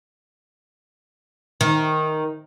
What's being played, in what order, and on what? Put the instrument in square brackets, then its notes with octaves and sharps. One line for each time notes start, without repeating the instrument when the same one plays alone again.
[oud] D#3